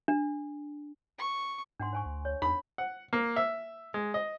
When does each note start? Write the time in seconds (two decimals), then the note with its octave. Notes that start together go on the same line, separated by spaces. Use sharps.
0.08 D4
1.18 C#6
1.80 G#2 D4 F#5 C6
1.93 C5 G#5 C#6
2.05 D2
2.25 C#5
2.42 E2 B5
2.78 F#5
3.13 A#3
3.36 E5
3.94 G#3
4.14 D#5